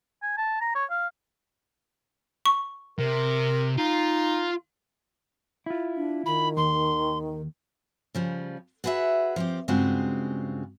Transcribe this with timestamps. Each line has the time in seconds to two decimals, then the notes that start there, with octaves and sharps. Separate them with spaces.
0.23 G#5
0.38 A5
0.61 A#5
0.75 C#5
0.90 F5
2.46 C#6
2.99 C3 A#4
3.78 D#4 F4
5.66 E4 F4
5.96 D4
6.26 D#3 B5
6.57 D#2 C6
8.15 C#3 F3 G3
8.84 F#4 G#4 B4 C#5 E5 F#5
9.36 F3 C4 G4
9.68 G2 C#3 G#3 C4 F4 F#4